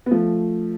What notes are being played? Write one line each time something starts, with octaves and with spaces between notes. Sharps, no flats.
B3
F3 A3